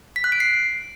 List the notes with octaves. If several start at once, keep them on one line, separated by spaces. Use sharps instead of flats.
B6
F#6
D7
C7